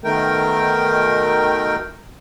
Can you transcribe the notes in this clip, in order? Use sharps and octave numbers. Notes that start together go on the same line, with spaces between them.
B2 D#3 A3 A#4 G5